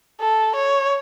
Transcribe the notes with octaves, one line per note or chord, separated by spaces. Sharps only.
A4
C#5